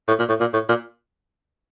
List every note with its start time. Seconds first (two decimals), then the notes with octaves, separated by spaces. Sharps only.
0.08 A2
0.19 A#2
0.29 A2
0.40 A#2
0.53 A2
0.69 A#2